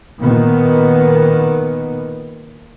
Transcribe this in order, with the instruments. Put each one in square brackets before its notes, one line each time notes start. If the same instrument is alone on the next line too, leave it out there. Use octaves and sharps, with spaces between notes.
[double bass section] A#2 D#3 B3